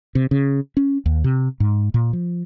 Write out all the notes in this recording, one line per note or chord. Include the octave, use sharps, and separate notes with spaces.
C3
C#3
C#4
D#2
C3
G#2
A#2
F3